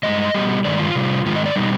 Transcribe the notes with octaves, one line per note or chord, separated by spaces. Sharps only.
G2 F3 G#3 D#5
B2 G3
G2 D#3 G#3 D5
F4
C3 G3
G#2 D#3 G#3 F4
D#5
D5
B2 G3 D#4